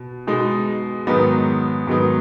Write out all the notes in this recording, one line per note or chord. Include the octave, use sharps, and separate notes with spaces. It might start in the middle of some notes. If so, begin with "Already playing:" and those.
Already playing: B2
B2 G#3 D#4
G#2 D#3 F#3 B3 D#4
G#2 D#3 F#3 B3 D#4